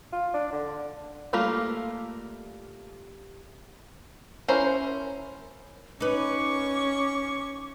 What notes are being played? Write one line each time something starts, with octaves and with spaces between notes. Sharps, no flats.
F4
D4
D3
G3 A3 A#3 F4
C#4 E4 A#4 C5
C#4 D#4 B4 C#6 D6